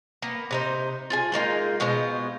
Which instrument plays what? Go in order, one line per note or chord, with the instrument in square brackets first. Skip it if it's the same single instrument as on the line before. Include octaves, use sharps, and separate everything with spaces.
[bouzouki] A#3 B3
C3 D#4 C5
F4 G#4 G#5
G#3 A#3 D#4 F4
B2 G#3 F4 C5